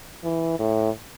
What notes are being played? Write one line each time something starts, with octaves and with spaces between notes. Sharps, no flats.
E3
A2